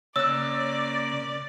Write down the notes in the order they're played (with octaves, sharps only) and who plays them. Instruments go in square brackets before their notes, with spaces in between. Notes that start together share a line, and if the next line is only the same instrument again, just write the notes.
[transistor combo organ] C#3 A#3 [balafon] C#5 [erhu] D5 [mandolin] E6 F#6